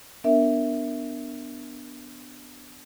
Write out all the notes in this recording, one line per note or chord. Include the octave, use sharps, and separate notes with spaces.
B3 D4 A#4 E5